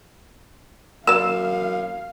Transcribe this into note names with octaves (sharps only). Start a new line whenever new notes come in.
F#2 A#3 D5 F5 E6